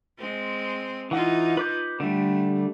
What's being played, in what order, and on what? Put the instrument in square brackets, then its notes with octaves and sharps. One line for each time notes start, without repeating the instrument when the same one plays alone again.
[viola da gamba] G#3 C4
[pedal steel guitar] E3 F#5 [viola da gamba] D#4 F4
[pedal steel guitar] B4 D6 G6
[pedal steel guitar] D3 G3 [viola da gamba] A3